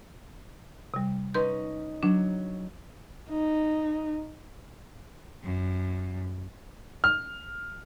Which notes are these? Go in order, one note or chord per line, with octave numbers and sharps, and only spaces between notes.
C3 G3
C#4 D#4 B4 C6 G6
F#3 D4
D#4
F#2
F6